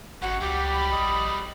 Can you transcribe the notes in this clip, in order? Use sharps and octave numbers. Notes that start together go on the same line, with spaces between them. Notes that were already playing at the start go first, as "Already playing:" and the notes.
G#1 F#2 F#4 F#5
C#2 F#3 G3 G4 D6
B5
A#1 D#5